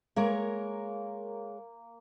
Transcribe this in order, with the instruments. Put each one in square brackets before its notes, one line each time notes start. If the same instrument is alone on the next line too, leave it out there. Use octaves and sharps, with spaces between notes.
[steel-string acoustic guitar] G#3 A#4 C#5 [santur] A#3